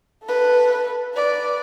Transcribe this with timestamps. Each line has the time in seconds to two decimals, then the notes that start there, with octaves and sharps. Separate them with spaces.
0.24 A4 B4
1.15 B4 D5